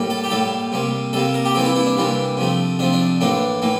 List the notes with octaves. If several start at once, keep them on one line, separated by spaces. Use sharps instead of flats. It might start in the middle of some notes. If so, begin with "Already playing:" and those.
Already playing: A2 G3 A#3
A4
G4
A2 G3 A#3 A4
C3 G3 A#3
C3 G3 A#3 A4
A#4
G4
C3 E3 G3 A#3 A4
E4
E4
D4
C3 E3 G3 A#3
C3 F3 A3
C3 F3 A3 D4
D4
A2 E3 A#3 D4
A2 E3 A#3